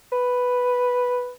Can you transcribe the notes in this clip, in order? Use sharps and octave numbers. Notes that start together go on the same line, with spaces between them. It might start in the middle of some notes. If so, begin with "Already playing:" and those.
B4